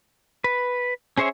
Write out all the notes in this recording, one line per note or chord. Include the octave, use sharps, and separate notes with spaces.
B4
C#4 G#4 C5 C#5 E5